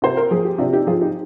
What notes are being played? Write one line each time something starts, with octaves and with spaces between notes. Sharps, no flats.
C3 C5
A#4
F3 G#4
G4
C3 D4 F4
D#4 G4
F3 F4 G#4
D#4 G4